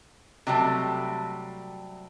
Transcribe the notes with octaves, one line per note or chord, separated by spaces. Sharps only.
C3 F#3 G3 A3